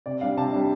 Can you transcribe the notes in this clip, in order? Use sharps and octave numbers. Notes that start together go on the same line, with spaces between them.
C3 D5
G3 D4 F5
C3 A5
G3 D4